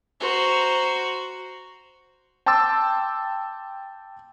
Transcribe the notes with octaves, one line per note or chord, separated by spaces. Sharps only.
F#4 C5 A#5
G5 A5 C6 D6 E6 A6